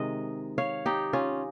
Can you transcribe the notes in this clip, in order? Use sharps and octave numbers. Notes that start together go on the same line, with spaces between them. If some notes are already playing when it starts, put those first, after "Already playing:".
Already playing: C3 D#3 G#3 D#5
C#5 F5
D#4 G4
C#4 F4